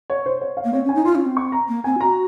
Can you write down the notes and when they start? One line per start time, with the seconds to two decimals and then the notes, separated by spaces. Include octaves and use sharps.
0.10 C#5
0.26 C5
0.41 C#5
0.57 F5
0.64 A#3
0.73 C4 C#5
0.84 C#4
0.89 G#5
0.95 D#4
1.05 F4 C6
1.15 C#4
1.26 C4
1.37 C#6
1.52 A#5
1.68 A#3
1.84 C4 G#5
2.00 F#4 A#5